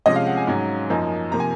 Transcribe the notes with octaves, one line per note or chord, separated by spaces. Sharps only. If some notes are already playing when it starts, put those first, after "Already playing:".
C3 F3 G#3 C#4 D#5
F5
F#5
G#5
G#2 F#3 C#4
F#2 F3 A#3 D#4
C3 F3 A#3 A#5
G#5